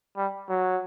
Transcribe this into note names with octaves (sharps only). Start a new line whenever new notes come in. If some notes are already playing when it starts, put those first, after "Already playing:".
G3
F#3